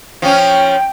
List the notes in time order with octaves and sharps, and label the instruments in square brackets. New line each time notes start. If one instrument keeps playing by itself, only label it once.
[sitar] F3 C#4 [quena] G5